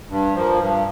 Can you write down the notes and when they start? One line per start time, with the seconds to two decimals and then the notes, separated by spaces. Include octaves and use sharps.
0.10 G2
0.35 F3 A#3
0.59 G2